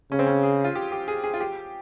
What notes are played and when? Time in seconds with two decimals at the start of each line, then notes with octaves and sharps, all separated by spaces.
0.12 C#3 C#4
0.19 C4
0.27 C#4
0.43 G#4
0.64 F4
0.75 G4
0.92 G4
1.08 G#4
1.24 G#4
1.34 F4
1.40 G4